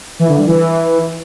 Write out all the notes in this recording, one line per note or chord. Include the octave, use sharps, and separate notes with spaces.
E3
D3
G3
E3